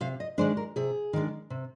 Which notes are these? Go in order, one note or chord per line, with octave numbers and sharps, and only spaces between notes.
C3 F5
D#5
D#3 G#3 D4 C5
A#4
C3 G#4
D#3 G#3 D4
C3